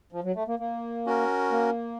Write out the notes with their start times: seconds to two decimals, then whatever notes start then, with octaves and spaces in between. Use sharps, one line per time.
0.12 F3
0.24 F#3
0.35 A3
0.48 A#3
0.59 A#3
1.06 C#4 F#4 A#4
1.51 A#3